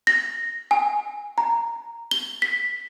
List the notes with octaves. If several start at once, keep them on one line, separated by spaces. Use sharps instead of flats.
A#6
G#5
A#5
G7
B6